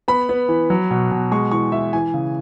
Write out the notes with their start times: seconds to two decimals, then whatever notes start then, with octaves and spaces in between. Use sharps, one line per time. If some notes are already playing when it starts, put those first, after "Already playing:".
0.08 B3 B5
0.29 B3
0.49 E3
0.70 F#3
0.91 B2
1.11 B2
1.32 G#3 C#6
1.51 E3 C#6
1.72 E3 E5
1.93 E3 G#5
2.14 C#3